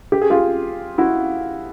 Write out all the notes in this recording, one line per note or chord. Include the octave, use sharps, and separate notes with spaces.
G4
G#4
F4 G4
E4 F#4